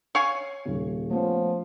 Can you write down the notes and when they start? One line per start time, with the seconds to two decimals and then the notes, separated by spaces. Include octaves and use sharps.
0.15 C#5 F5 G#5
0.65 D#1 C#3
1.11 F3 A3 B3 C#4